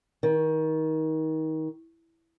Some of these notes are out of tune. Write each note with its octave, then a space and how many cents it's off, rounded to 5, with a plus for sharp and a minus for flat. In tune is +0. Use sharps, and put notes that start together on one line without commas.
D#3 +25